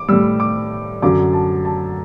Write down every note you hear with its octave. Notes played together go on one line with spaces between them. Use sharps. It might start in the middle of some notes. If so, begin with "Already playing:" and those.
Already playing: D6
A2 G3 E6
D6
F#2 D3 F#3 D6
A5
A5